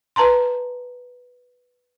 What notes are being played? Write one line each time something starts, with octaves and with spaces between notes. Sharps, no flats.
B4 A5 A#5 C6